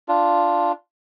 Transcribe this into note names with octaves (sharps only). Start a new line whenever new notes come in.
D4 F4